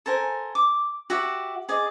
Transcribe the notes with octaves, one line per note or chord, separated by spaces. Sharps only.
A4 A#4 C5 G#5
D6
F#4 G4 E5 F#5
G#4 D5 D#5